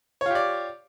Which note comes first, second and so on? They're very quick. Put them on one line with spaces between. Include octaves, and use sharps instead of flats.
C#5 F4 G4 D5